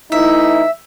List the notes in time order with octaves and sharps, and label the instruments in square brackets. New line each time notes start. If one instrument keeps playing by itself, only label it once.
[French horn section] E3 A3 E4 [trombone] D#4 [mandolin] E5